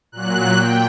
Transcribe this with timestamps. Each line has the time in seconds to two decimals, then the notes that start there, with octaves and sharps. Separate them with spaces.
0.12 A#2 F#3 F#6
0.55 A#2 G5